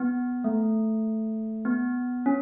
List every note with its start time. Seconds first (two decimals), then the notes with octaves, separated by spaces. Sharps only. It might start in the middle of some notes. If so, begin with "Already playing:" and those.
Already playing: B3
0.44 A3
1.65 B3
2.26 C#4